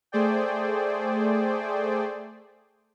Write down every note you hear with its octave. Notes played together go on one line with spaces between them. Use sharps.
A3 G#4 C5 D5 G5